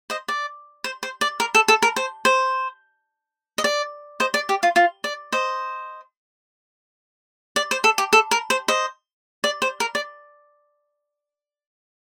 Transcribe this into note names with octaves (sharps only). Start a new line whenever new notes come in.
C5 D#5
D5
C5
C5
D5
A#4
A4
A4
A#4
C5
C5
D#5
D5
C5 D#5
D5
G4
F4
F4
D5
C5 D#5
D5
C5
A4
G4
A4
A#4
C5
C5 D#5
D5
C5
A#4
D5